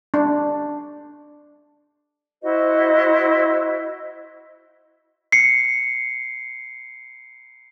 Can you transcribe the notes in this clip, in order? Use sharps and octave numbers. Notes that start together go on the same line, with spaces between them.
D4
E4 F#4 C5 D#5
C7 C#7